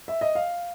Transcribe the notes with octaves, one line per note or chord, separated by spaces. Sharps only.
E5
D#5
F5